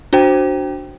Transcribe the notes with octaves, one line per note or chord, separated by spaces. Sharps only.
D4 F#4 C5 G5